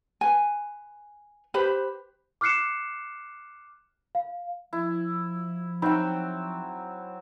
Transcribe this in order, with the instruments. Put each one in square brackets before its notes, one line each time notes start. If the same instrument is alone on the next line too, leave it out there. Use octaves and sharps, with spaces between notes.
[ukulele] B4 G#5
G4 B4 C5 B5
[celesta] D6 F6 F#6 C7 C#7 E7
F5
[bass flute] F3 [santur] E4
[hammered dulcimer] F#3 F#4 G5 [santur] C4 E5 [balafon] D#4